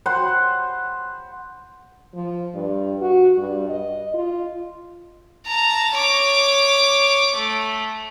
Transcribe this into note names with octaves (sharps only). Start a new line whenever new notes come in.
C5 F#5 B5 C6
F3
G2
F#4
G2
D#5
F4
A5 A#5
C#5 D6
A3